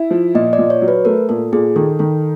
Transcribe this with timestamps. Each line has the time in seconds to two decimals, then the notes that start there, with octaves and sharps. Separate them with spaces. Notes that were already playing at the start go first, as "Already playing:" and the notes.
Already playing: E4
0.11 F3
0.35 A#2 D#5
0.53 D5
0.59 A#2
0.70 C#5
0.82 F#3
0.88 B4
1.05 A3 A#4
1.29 A#2 A4
1.52 A#2 G#4
1.76 D#3 A4
1.99 D#3 A4